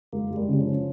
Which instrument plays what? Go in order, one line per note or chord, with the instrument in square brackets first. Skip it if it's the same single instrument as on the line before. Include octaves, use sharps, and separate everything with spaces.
[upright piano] G#3 [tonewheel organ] A#3
[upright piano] G#3
[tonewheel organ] G3
[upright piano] C#3 [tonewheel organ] G3
[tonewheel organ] F3 [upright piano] C#4